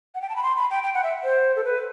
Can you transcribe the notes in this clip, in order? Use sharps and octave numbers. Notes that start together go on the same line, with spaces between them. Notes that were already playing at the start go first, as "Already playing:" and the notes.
F#5
G5
A5
B5
C6
B5
G5
G5
F#5
E5
C5
A4
B4